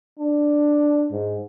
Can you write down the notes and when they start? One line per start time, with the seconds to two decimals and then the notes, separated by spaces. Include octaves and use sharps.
0.20 D4
1.11 G#2